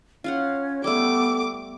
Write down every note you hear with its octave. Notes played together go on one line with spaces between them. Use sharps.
C#4 F4 F5 F#5
G3 A3 B3 A4 D6